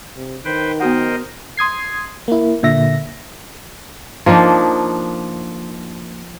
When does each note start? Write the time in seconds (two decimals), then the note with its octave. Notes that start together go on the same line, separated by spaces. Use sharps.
0.16 C3
0.45 D#3 B4 C5 G5
0.80 B3 F#4 A#4 C5 D#5 F#5
1.57 C6 D#6 G#6 C7
2.28 A#3 E4
2.63 A#2 D3 E5 A#6
4.26 F3 A#3 D4 D#4